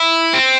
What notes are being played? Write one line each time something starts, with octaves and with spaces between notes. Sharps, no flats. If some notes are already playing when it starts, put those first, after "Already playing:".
Already playing: E4
C4